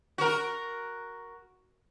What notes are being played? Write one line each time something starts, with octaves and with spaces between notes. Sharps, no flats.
F#4 A#4